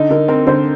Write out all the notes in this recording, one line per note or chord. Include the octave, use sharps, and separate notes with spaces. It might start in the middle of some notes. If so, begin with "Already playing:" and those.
Already playing: D3 D#4
D3 A#4
C4 A#4
D3 C5